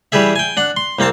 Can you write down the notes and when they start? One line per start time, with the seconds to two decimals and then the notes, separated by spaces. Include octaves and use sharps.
0.12 E3 G3 G4 G#4 E5
0.36 G5 G#5
0.57 D4 F#5
0.77 C6
0.99 C2 A#3 C4 F5 A5